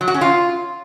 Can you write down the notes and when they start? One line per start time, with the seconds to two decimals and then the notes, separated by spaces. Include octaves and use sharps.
0.01 F#3
0.08 F#4
0.14 C#4
0.21 F4